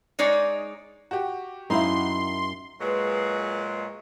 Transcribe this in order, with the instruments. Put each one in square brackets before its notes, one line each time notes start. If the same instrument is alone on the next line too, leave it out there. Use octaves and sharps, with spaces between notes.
[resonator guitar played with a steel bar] G#3 D#4 C#5 D5
[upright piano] F#4 G4
[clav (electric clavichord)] F#2 F5 [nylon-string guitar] D#4 E4 [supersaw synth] C6
[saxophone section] A#2 F#3 G#3 [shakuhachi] B4